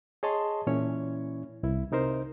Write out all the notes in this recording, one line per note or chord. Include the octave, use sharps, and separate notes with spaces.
G#4 C#5 D#5 A5 C6
A#2 E3 C#4 E4 C#5
C2 E4
C3 D#4 A#4 C5